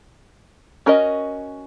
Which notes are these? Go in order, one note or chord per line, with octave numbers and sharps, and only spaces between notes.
C#4 F#4 A#4 D#5